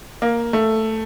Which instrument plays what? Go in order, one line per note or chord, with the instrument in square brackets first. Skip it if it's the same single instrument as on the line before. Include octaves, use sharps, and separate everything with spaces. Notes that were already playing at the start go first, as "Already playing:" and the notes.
[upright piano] A#3
A3